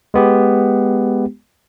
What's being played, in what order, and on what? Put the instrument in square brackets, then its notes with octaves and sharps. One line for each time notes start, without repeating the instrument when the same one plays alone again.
[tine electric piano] G#3 B3 G4